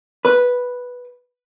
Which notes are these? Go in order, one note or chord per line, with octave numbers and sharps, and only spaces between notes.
B4